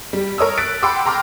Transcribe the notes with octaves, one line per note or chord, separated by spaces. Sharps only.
G3
A#4 C#5 D#6 E6
F#6 A6 B6 D7
F#5 G5 B5 C6 D6 E6
G5 A#5 C6 D6 F6